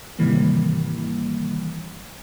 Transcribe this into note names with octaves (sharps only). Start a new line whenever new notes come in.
G#2 C3 D#3 E3 G3 A#3